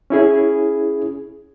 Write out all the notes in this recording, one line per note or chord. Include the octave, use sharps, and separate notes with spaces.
C#4 E4 G#4